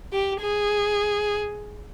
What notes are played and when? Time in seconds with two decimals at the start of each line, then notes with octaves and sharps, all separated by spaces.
0.13 G4
0.41 G#4